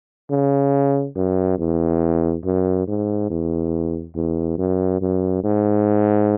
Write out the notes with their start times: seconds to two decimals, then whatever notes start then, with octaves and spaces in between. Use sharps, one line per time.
0.31 C#3
1.16 F#2
1.58 E2
2.44 F#2
2.87 G#2
3.30 E2
4.15 E2
4.58 F#2
5.01 F#2
5.44 G#2